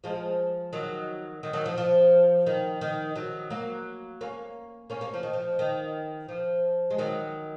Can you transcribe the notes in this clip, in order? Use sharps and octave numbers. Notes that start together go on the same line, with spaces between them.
F3 G#3
D#3 F#3
D#3
D#3 F#3
F3
F3
D#3
D#3
D#3 F#3
F#3 A#3
A#3 C#4
A#3 C#4
A#3 C#4
F3
D#3
F3
D#3
F3
G#3
D#3 F#3